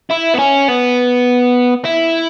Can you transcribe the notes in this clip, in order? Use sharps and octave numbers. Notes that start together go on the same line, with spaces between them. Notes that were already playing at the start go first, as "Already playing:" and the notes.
E4
B3
C#4
B3
E4